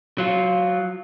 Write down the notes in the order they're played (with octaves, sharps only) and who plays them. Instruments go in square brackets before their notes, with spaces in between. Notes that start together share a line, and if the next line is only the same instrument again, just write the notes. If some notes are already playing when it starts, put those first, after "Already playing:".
[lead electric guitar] F#3 F4